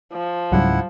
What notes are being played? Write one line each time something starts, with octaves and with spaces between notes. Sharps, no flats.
F3
C#2 G#2 C#3 F#3 G3 E4 F#5